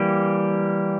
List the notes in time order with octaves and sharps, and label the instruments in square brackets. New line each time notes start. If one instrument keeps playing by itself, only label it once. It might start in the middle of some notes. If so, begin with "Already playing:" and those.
Already playing: [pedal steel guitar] E3 G3 A#3 G4